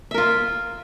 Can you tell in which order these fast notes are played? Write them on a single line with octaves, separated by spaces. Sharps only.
E5 A#4 F4